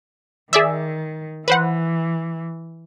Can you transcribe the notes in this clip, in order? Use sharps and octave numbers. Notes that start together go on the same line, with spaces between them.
D#3 G#4 D5 E5
E3 B4 C5 F#5